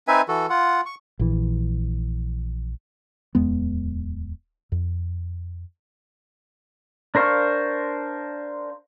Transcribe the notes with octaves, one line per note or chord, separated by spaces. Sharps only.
C4 D#4 B4 E5 G#5
E3 F#4 A4
F4 F#5
C#6
A#1 E3
D1 E2 G#3 B3
F2
D4 A#4 C5 F5 C#6